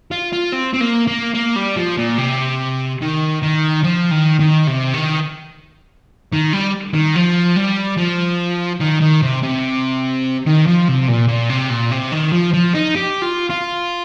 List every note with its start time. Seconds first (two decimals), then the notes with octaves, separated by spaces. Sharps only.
0.11 F4
0.32 F4
0.52 C4
0.73 C4
0.81 A#3
1.07 A#3
1.35 A#3
1.56 G3
1.76 F3
1.97 A#2
2.18 C3
3.02 D#3
3.42 D#3
3.83 F3
4.11 D#3
4.40 D#3
4.67 C3
4.94 D#3
6.32 D#3
6.53 G3
6.94 D#3
7.16 F3
7.56 G3
7.97 F3
8.81 D#3
9.01 D#3
9.22 C3
9.43 C3
10.46 D#3
10.66 F3
10.88 C3
11.08 A#2
11.28 A#2
11.50 C3
11.70 A#2
11.91 C3
12.12 D#3
12.32 F3
12.54 F3
12.74 D#4
12.95 G4
13.22 F4
13.50 F4